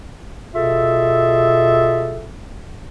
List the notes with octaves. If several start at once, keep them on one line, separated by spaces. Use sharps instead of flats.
B2 F4 G#4 A4 E5